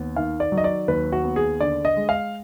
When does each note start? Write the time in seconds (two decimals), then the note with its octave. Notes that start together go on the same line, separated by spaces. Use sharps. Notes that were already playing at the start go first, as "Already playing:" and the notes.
Already playing: D#2 B3
0.16 D#3 F5
0.40 D5
0.52 F#3
0.58 D#5
0.64 D5
0.88 D#2 B4
1.13 F#4
1.24 B3
1.36 G#4
1.61 D3 D5
1.85 D#5
1.97 G#3
2.09 F5